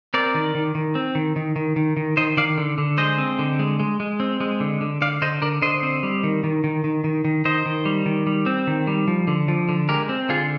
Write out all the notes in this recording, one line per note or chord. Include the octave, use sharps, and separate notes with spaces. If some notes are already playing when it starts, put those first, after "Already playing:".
C4 A#4 D5
D#3
D#3
D#3
C4
D#3
D#3
D#3
D#3
D#3
D#3 C5 D#5
D#3 D5 F5
D3
D3
G#3 C5 D#5
C4
D3
G#3
G#3
G#3
C4
G#3
D3
D3
D3 D5 F5
D3 C5 D#5
D3 A#4 D5
D3 C5 D#5
C4
G3
D#3
D#3
D#3
D#3
D#3
D#3
D#3 C5 D#5
D#3
G3
D#3
G3
C4
D#3
G3
F3
D3
F3
D3
G#3 G4 A#4
C4
D3 F4 G#4